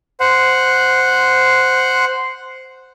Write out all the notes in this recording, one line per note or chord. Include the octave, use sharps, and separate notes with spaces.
C5 F#5